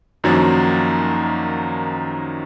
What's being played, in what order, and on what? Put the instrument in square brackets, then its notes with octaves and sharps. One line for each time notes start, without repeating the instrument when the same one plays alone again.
[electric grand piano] F#2 D#3 F3 F#3 A#3 D4